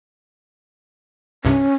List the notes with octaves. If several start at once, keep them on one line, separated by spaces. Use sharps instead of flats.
C2 G2 C3 C#4